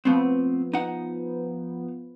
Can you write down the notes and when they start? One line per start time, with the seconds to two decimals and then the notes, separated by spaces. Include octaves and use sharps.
0.05 F3 A3 B3 C4
0.73 D#4 F#5